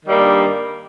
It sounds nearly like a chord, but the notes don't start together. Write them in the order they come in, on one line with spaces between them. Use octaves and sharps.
D#3 G3 A#3 G2